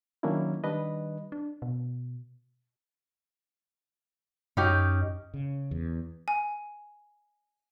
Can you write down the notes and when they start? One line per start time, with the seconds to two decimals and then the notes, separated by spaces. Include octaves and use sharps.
0.23 D#3 F#3 A#3 C#4 D4 E4
0.64 D#3 G3 D4 B4 D#5
1.32 D4
1.62 B2
4.57 F#2 C#4 D#4 G4
5.34 C#3
5.71 E2
6.28 G#5